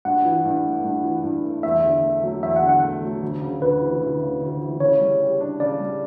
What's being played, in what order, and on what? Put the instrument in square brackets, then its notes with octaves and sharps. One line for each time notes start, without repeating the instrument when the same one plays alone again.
[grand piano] G2 [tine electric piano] F#5
[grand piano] E3
G2
A3
G2
E3
G2
A3
[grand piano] E2 [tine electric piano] E5
[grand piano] D3
A3
F#3
[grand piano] E2 [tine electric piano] E5
[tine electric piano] F#5
[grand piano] D3
[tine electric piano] F#5
[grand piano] A3
F#3
D2
C#3
[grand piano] D2 [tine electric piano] B4
[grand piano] E3
D2
C#3
D2
E3
[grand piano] C#3 [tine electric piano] C#5
[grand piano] G3
G4
D4
[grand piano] C#3 [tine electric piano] D5
[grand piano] G3